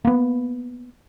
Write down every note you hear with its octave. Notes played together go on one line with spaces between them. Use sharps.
A#3 B3